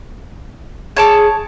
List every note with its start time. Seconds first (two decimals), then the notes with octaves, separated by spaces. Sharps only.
0.96 G#4 C#5 A5 D6